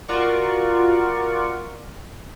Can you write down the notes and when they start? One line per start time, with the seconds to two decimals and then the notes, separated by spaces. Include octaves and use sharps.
0.08 F4 F#4 A#4 D5 C#6